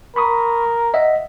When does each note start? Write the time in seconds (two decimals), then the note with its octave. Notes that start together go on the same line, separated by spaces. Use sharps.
0.16 A#4 B5 C#6 D#6
0.94 D#5 E5 F#5